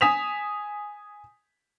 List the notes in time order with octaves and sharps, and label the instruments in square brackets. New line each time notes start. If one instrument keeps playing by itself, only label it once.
[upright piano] G#5 D#6 B6 E7 F7